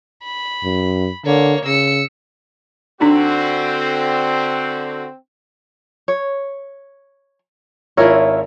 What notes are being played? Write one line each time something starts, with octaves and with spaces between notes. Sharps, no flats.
B5
F#2
D3 A#3 C#5
C#3 E6 C#7
D3 C4 D4 D#4 F#4
C#5
G#1 E4 F4 A#4 C#5 E5